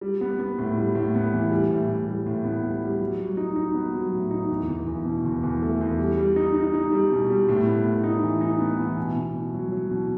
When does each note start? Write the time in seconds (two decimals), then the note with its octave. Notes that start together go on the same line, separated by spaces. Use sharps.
0.01 G3
0.21 B3
0.39 B3
0.59 A2
0.77 G3
0.95 A2
1.15 B3
1.33 E3
1.51 G3
1.70 A2
1.88 A2
2.07 G3
2.26 A2
2.44 B3
2.63 G3
2.82 G3
3.01 F#3
3.19 F#3
3.37 D#4
3.56 D#4
3.75 B3
3.94 F#3
4.12 A2
4.31 D#4
4.50 E2
4.69 E2
4.86 E2
5.05 B2
5.24 E2
5.43 E2
5.62 A3
5.81 E2
5.98 G3
6.17 G3
6.36 D#4
6.55 D#4
6.74 D#4
6.92 G3
7.11 B2
7.30 G3
7.49 A2
7.66 B3
7.86 A2
8.04 D#4
8.23 E3
8.41 D#4
8.60 B3
8.79 E3
8.97 B2
9.16 B2
9.35 B2
9.54 F#3
9.72 F#3
9.91 B2